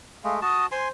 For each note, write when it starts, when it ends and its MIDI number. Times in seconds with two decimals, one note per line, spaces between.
0.24 0.40 56
0.24 0.40 57
0.24 0.35 77
0.42 0.67 66
0.42 0.67 81
0.42 0.66 87
0.72 0.91 72
0.72 0.88 80
0.72 0.88 84